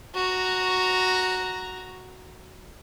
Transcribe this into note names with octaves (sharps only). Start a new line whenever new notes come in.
F#4 A#5